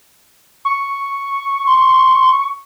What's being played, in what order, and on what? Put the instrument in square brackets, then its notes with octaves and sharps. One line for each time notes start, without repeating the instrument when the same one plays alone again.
[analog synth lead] C#6
[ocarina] C6